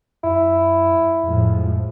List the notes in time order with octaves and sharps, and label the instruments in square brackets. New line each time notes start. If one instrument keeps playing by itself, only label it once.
[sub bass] F#2 [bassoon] E4
[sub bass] F2 [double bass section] A2 F3 G#3